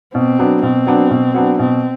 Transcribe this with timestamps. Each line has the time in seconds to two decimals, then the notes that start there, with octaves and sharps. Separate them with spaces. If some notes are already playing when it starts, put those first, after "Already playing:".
0.14 B2 C4
0.39 F#3 B3 D4
0.63 B2 C4
0.87 F#3 B3 D4
1.10 B2
1.34 F#3 B3 D4
1.59 B2 C4